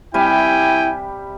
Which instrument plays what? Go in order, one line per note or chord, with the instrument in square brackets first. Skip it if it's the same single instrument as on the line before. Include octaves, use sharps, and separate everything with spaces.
[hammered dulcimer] C3 G3 [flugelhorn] E4 [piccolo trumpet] G5 [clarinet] G#5